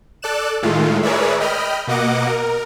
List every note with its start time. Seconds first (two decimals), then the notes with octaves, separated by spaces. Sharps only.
0.22 A4 D5 F#6 E7
0.63 A2 D#3 G#3 A3 F4
1.03 G#4 A#4 B4 C#5 D5 E5
1.40 D#5 G5 B5 F6
1.87 B2 A#3 D#5 F#5 D6
2.27 A#4